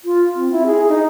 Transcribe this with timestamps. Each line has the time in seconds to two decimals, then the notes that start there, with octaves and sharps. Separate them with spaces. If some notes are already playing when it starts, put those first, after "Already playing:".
0.05 F4
0.35 C4
0.52 E4
0.66 G#4
0.89 D#4